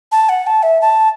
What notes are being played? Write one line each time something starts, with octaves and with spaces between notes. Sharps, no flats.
A5
F#5
A5
E5
A5